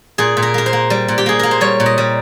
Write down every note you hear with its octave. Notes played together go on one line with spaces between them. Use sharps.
A#2 G#4
A#2
A#4
A#3 A#4
C5
A#3
G3
A#2
G4
A#3 G#4
A#3 A#4
C5
G3 C#5
A#2
D#5
G3